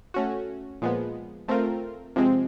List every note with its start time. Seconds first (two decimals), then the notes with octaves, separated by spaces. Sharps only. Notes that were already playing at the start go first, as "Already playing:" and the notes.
0.14 A3 C#4 F#4
0.82 A#2 F3 G#3 B3
1.48 A3 C4 F4 A#4
2.16 C3 F3 G#3 C4